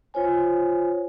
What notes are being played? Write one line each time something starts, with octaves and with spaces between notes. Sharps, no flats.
F4 C5 C#5 G#5